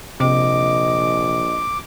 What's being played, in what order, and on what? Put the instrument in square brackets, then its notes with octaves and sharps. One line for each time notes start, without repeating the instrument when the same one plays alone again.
[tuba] A#1 [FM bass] C3 [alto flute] D#5 [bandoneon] D6